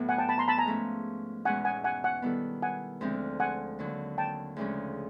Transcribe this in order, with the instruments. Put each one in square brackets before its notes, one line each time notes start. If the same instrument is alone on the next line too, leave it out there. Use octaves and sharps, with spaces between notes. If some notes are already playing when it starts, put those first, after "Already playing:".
Already playing: [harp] A2 F#3 B3
[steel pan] F#5 G#5
G5 A5
A5 B5
A#5 C6
A5 B5
G#5 A#5
[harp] G#2 F3 A3 C#4
[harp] E2 B2 G#3 C#4 [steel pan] F#5 G#5
[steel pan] F#5 G#5
F#5 G#5
F#5 G#5
[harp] D#3 G3 B3 E4 A4
[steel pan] F#5 G#5
[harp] D2 D3 F3 G#3 C4
[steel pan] F#5 G#5
[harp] D#2 D3 F#3
[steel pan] G5 A5
[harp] D2 C#3 F3 G#3 C#4